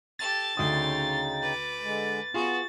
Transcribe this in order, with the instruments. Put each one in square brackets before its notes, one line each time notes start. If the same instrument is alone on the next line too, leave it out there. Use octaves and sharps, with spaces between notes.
[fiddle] G4 A4 [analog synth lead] A6
[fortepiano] D2 D#6 [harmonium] C#3 D#4 G5 [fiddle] C#4 C6
[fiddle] B4 D6
[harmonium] D3 G#3
[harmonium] B3 [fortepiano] F4 G#4 [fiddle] F#4